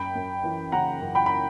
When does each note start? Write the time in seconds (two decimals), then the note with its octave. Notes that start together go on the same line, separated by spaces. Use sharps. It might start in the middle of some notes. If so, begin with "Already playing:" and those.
Already playing: F#2 G5 B5
0.15 F#2
0.44 E3
0.72 C#3 F#5 A#5
1.01 F#2
1.15 G5 B5
1.26 B5